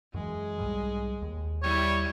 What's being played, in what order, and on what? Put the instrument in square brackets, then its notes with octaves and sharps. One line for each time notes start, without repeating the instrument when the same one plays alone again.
[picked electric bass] F#2 E3 [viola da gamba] G#3
[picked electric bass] B1 G#2 G3
D#2
[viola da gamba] G3 E4 [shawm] C#5